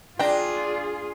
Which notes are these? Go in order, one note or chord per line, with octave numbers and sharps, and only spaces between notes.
D4 F4 G#4 G5 A#5